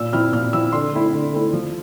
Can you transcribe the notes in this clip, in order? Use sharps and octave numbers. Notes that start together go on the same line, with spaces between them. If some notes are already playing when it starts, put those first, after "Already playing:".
Already playing: A#2 E6
F3 C4 E4 F6
A#2 F6
F3 C4 E4 E6
D3 C6
A3 C4 E4
D3
A3 C4 E4
F3